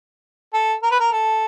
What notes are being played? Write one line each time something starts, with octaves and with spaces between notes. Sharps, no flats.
A4
A#4
B4
A#4
A4